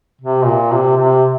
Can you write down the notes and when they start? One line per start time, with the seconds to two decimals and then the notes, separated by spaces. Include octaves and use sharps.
0.21 C3
0.46 A#2
0.73 C3
0.97 C3